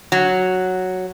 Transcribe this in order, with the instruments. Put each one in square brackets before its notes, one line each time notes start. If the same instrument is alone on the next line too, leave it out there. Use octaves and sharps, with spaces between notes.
[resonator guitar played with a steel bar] F#3